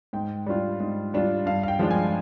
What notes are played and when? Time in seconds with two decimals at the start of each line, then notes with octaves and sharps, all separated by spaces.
0.13 G#2 G5
0.46 G3 D4 F4
0.80 G#2
1.14 G3 D4 F4
1.46 G2 F5
1.63 F5
1.68 G5
1.79 F3 G#3 D4 F4
1.91 G#5